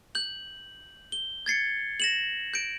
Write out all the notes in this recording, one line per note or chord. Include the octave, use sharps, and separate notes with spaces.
G6 F#7
G7
G#6 A6 C7 C#7
A#6 E7 F#7
G6 D7